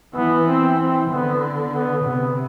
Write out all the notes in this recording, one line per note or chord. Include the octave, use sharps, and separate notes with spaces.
E3 B3
C4
C4
D3 B3
B3
C3 B3